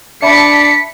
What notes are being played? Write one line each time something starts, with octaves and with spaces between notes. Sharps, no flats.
D4 E5 A5 B5 B6 C#7